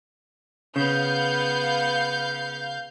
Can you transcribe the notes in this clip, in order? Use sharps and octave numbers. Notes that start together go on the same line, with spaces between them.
C#3 B3 F5 G6